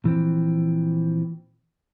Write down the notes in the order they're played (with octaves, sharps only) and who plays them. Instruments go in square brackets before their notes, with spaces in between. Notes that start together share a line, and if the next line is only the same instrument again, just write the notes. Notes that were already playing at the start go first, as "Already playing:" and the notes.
[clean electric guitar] A#2 E3 F3 C4